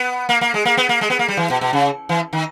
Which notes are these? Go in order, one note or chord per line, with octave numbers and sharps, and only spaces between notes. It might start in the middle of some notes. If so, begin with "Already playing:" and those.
Already playing: B3
A#3
A#3
G#3
A#3
B3
A#3
G#3
B3
A#3
G3
E3
B2
B2
C#3
E3
D#3